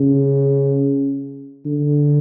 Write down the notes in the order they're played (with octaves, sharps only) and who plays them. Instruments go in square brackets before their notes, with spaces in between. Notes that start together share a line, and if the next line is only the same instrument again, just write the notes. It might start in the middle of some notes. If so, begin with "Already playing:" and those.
Already playing: [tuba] C#3
D3